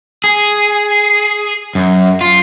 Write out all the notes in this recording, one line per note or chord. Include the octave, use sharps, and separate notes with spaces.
G#4
F#2
F4